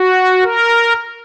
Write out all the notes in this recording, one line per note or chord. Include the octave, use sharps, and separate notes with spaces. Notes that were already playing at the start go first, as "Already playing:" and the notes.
Already playing: F#4
A#4